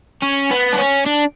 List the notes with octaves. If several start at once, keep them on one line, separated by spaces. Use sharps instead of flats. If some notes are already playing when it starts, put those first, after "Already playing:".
C#4
B3
D4
C#4
D4